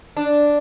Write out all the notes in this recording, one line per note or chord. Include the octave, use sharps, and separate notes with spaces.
D4